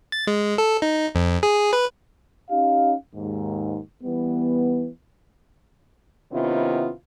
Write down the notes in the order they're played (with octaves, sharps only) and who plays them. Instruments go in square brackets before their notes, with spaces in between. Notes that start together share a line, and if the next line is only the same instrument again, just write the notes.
[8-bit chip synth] A6
G#3
A4
D#4
F2
G#4
B4
[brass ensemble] C#4 D#4 G4 F5
D#2 G#2
E3 G3 B3
[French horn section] C3 D#3 B3 C#4 E4 F4